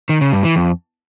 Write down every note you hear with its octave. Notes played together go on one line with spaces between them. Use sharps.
D#3
C#3
G2
E3
F2